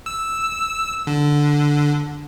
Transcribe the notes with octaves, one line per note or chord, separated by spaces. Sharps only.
E6
D3